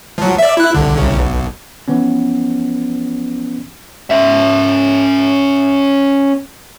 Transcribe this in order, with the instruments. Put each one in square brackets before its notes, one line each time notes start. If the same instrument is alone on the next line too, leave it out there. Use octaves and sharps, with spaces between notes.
[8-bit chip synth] F3 F#3
D5 E5
E4 F#6
C2 D3
C2 C#3
B1
[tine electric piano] E3 F3 B3 C#4
[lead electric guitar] C#4 E5